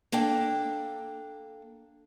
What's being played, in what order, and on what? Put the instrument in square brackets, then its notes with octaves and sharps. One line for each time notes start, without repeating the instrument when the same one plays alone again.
[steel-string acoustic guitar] A#3 D4 A4 G5